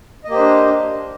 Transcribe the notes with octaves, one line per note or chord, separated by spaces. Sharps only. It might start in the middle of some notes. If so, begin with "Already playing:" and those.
A#3 D4 G4 C5 D#5